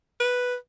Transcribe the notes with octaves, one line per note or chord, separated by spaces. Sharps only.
B4